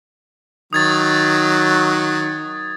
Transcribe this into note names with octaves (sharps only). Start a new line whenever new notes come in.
D#3 F#3 D#6 G#6 A6